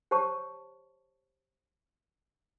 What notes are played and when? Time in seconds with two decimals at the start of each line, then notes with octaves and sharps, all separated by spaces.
0.11 G4 C5 C#5 A5 C#6